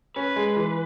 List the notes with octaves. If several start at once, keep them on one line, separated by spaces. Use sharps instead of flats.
C#4 B4
G#3
E3